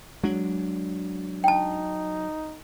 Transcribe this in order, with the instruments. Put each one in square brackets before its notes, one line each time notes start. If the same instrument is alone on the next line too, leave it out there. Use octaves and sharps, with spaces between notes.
[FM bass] F#3 [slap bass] G#3 D4
[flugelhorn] D#4 [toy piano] G5 A5